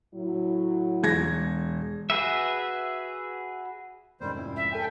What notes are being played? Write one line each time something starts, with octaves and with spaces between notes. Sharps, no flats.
A2 F#3 E4
E1 G#6 A#6
F#4 G#4 B4 E5
F1 G#2 D#3 G3 C#4 C5
A#2 E4
E5
C#4 A4 G5 G#5